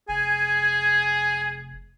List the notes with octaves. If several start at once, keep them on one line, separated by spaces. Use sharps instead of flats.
F1 G#4 G#5